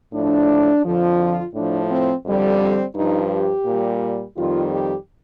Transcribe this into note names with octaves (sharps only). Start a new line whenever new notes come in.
A2 F3 D4
F2 D3 F3
F4
A2 F3 D4
C4
F2 D3 G3
C4
G2 F3 D#4
G4
A#2 G3
F2 D#3 G3 F4
G4